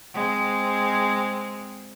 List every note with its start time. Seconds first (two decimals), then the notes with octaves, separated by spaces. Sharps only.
0.14 G#3 C4